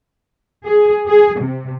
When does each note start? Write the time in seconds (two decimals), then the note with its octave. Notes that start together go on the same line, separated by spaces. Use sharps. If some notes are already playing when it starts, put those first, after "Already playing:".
0.66 G#4
1.06 G#4
1.39 C3